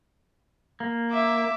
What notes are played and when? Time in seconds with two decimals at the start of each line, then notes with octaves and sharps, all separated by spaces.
0.80 A#3
1.11 E5 D6